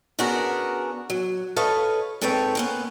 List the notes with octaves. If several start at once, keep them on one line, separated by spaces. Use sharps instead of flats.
B3 C#4 D4 F#4 G#4 A#4
F#3
A4 B4 C#5 D#5 F5
G#2 C4 A4 B4 C#5 G5
A#3 B3 C#4